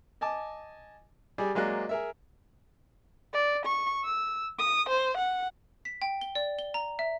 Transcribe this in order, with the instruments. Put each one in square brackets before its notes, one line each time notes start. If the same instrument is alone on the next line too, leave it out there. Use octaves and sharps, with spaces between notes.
[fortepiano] D#5 G#5 A5 D6
G3 G#4 D5
F#3 G#3 A#3 D5 F#6
G#4 A#4 E5
[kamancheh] D5
C#6
E6
D#6
C5
F#5
[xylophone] B6
G5
G7
D5
G7
A#5
E5